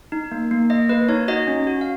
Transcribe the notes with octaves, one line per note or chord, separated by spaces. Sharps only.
D#4
A#3
A#3
A#3 D#5
A#3 B4
D#4 C#5
F#4 D#5
C#4
F#4
F5